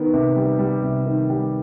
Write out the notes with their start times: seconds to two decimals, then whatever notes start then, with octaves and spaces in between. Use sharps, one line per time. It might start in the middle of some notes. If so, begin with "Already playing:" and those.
Already playing: D#3 B3
0.14 C3
0.36 G3
0.59 G3
0.83 C3
1.06 D#3
1.30 G3